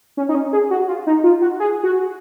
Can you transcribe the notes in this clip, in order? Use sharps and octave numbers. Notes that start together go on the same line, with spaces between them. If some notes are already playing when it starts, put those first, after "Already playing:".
C#4
D#4
C#4
G#4
F#4
F4
D#4
F4
F#4
G#4
F#4